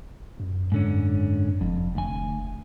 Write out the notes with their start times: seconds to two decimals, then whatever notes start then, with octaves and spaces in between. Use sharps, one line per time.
0.40 F#2
0.72 G#2 D3 C#4
1.61 F1 F2
1.95 D2 G#5